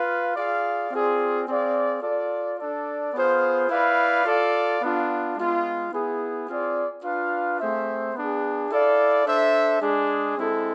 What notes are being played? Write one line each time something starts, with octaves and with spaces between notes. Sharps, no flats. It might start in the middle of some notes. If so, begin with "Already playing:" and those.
Already playing: F4 B4 F5
F4 G#4 D5 F5
C4 F4 G#4 D5
C4 G#4 D5 F5
F4 A4 D5
D4 A4 D5
B3 F4 G#4 C5 F5
E4 B4 D5 F5
F4 A4 D5 F5
B3 D4 F4
G#3 B3 F4
B3 E4 G#4
C4 F4 G#4 D5
D4 F4 B4 F5
A3 C4 G#4 C5 E5
B3 D4 G#4
E4 A4 D5 F5
D4 A4 C5 E5
G#3 D4 G#4
G#3 C4 E4 A4